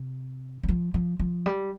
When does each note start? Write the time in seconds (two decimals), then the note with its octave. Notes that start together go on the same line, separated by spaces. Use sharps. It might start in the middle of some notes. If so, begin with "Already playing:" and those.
Already playing: C3
0.63 G3
0.68 F3
0.94 F3
1.19 F3
1.46 G3